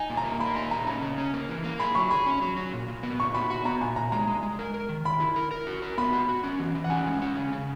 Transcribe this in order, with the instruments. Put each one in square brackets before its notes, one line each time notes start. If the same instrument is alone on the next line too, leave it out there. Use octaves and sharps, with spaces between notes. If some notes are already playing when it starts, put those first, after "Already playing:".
Already playing: [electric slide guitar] D#4 [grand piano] G#5
[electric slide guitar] A#2
[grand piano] A#5
[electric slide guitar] A#3
[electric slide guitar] A#3 [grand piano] B5
[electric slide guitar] D#4 [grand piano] B5
[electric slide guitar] A#2 [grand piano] A#5
[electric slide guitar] C#4 [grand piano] A#5
[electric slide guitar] C#3
C#4
A#3
E3
A#3
[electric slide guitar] G#4 [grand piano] B5
[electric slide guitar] F#3 [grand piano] C#6
[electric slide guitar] G#4 [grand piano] B5
[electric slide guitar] C#4
F#3
F#3
A#2
A#2
B3
[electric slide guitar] A#2 [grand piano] C#6
[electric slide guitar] F#4 [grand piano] B5
[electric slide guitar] F#4 [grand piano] B5
[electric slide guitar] B3 [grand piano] A#5
[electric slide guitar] A#2 [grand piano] G#5
[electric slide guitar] A#2 [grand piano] A#5
[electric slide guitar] G#3 [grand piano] A#5
[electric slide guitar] G#3
G#3
A#4
A#4
D#3
[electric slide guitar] D#3 [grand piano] B5
[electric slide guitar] E4
A#4
A#4
F#4
A#4
[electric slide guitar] B3 [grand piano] B5
[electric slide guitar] F#4
F#4
C#4
E3
E3
[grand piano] F#5
[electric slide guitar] C#4 [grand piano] G#5
[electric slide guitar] G#3
C#4
C#3
C#3